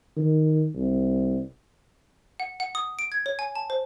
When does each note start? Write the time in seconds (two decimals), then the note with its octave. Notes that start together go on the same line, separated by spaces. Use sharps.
0.17 D#3
0.75 C2
2.40 F#5
2.60 F#5
2.75 D#6
2.99 D7
3.12 G#6
3.26 C#5
3.39 G#5
3.55 A5
3.70 C5